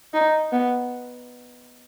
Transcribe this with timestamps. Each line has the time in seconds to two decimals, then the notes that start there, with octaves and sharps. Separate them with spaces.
0.14 D#4
0.52 B3